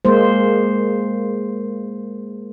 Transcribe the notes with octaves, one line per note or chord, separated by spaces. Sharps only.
G#3 A#3 C5